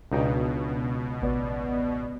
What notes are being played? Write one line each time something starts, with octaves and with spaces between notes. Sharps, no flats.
C#2 B2 D4 D#4 G5
A1 B3 D5